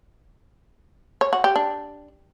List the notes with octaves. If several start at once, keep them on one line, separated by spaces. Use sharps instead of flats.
C#5
F#4
G4
D4